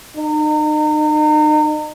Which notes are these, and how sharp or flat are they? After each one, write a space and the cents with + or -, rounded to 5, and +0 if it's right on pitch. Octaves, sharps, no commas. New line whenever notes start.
D#4 -35